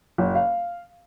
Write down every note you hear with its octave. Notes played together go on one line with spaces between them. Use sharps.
F#1
F5